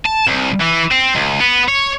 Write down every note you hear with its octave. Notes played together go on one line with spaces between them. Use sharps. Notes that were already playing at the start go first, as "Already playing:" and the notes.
A5
C2
E3
C4
C#2
B3
C#5